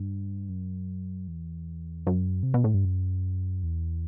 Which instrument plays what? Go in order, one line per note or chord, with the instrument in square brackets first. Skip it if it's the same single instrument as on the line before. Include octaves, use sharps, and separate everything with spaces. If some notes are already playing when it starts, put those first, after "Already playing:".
Already playing: [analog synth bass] G2
F#2
E2
F#2
C3
B2
A2
G2
F#2
E2